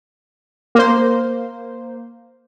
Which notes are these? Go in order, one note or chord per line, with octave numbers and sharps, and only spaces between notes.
A#3 C5